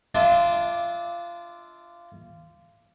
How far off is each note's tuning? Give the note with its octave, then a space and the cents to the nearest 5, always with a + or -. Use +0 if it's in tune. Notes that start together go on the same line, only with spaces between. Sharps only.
D4 +0 F4 -20 E5 -40